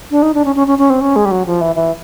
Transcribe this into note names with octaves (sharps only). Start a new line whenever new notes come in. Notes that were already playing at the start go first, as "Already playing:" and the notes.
D4
D#4
D4
C#4
C#4
C#4
C#4
C4
C#4
G#3
G3
F#3
F3
E3
E3